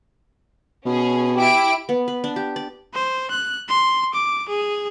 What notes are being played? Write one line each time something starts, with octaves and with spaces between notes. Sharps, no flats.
B2 C#4 G#4
E4 G4 D7
B3
B4
D4
G4
D5
C5
F#6
C6
D6
G#4